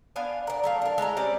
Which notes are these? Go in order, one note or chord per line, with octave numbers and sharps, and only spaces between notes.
B3 D4 F5 G#5
D4 A#4
F#3 A3 F5
D4 A#4
G#3 E4 D#5 A#5
C4 C#4 G4 D5